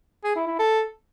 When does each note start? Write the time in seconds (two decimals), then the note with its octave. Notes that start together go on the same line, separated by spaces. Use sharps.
0.24 G#4
0.36 E4
0.47 E4
0.59 A4